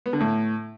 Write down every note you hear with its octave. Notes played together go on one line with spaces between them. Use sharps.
B3
D3
A2